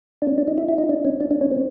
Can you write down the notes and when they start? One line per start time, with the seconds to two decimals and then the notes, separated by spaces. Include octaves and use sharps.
0.22 D4
0.27 C#4
0.38 D4
0.48 D#4
0.58 E4
0.68 E4
0.78 D#4
0.89 D4
1.05 C#4
1.21 D4
1.31 D4
1.41 C#4
1.51 C4